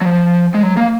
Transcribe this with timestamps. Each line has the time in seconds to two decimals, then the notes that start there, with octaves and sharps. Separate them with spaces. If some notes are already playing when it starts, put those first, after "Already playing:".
0.01 F#3
0.05 F3
0.54 G#3
0.63 F#3
0.77 A#3